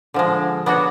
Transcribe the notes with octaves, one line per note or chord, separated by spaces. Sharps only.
D3 F3 G#3
B3 D4 F#4 C#5